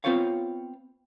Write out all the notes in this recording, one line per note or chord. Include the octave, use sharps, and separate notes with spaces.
B3 C4 F4 C5 C#5 F5